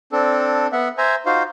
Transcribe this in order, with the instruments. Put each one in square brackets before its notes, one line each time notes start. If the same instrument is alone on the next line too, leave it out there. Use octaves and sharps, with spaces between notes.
[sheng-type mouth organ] C4 D4 A4
B3 E5 F#5
C5 E5 G#5 A#5
D#4 F4 F#4 C5 F5